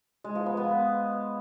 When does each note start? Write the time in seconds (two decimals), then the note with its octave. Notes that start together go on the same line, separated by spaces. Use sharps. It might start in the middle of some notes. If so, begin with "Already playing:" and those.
0.24 G#3
0.35 F3
0.46 B3
0.57 B3